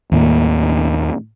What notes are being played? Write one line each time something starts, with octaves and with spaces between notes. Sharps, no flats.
D#2 A2 A#3